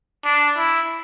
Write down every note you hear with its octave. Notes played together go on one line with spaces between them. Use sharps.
D4
E4